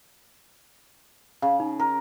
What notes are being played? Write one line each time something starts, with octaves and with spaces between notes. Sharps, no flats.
C#3 F5
D#4
A#4 A#5